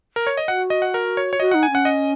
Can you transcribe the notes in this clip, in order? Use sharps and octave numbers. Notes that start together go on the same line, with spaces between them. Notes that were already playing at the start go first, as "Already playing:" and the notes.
A#4
C#5
D#5
F#4 F#5
D#5
F#5
A#4
C#5
C#5
F#4 D#5
D#4 F#5
G#5
C#4 F#5
D#5